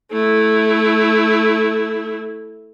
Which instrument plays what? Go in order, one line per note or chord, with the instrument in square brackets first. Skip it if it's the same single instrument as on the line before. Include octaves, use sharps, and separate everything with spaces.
[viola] A3 E4